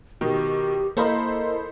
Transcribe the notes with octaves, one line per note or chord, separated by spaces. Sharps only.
B2 D#3 G4
A#3 E4 A4 A#4 C5 D#5 B5